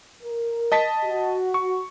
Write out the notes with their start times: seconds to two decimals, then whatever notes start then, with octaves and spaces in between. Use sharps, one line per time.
0.23 A#4
0.72 D#5 A5 B6
1.05 F#4
1.54 C#6